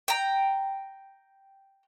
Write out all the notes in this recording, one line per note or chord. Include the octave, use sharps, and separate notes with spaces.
G5 A#5